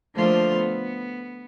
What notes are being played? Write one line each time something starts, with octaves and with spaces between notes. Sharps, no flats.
D3 F3 A3 A#3 F4 C5
B3